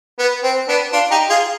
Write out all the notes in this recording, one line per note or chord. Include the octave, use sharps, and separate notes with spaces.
B3
C4
B3 D4
D4 F4
D#4 G4
F4 G#4